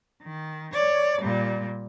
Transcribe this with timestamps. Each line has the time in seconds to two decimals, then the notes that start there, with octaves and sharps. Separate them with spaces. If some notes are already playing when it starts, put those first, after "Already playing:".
0.23 D#3
0.73 C#5 D5
1.21 A#2 G3